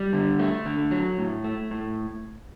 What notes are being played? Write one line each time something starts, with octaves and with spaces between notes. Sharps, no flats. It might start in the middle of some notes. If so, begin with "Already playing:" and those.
Already playing: G3
D3
A3
D3
F#3
A2
A3
A2